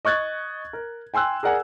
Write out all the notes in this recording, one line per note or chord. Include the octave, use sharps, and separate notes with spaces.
D#5 C#6 F#6 G#6 A6
A#4
G5 G#5 C6 E6 F#6
G#4 A#4 D5 F#5 G#5